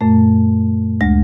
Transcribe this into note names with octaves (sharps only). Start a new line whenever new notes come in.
F#2 A#2 A3
D2 G#3 A#6